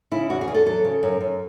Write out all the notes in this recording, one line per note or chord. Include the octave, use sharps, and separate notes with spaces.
C#3 E4
E2 F#4
G#4
E2
A4
F#3 A4
C#3
F#2
F#2